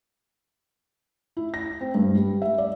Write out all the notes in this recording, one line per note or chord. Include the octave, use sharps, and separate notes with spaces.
E4
A#6
C4
G2
G3
E5
D5